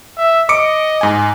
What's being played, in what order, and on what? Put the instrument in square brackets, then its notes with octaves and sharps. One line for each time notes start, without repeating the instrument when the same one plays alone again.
[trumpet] E5
[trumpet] D#5 [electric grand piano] D6 C#7 D7
[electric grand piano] G#2 G#5